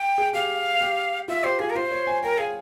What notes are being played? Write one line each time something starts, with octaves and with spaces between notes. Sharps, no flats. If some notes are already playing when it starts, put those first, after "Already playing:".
Already playing: G5
G#4
G4 F5
G4
F4 E5
G4 C5
F4 G#4
A#4
F4 C5
C#5
G#5
A#4 G5
G#4 F5